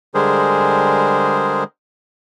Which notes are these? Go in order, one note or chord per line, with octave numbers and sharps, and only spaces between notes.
D3 G3 G#3 G#4 A#4 C5